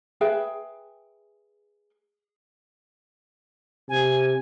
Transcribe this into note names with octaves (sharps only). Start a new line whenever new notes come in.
G#4 B4 E5 G5
C3 G#5